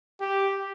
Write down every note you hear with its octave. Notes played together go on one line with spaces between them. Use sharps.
G4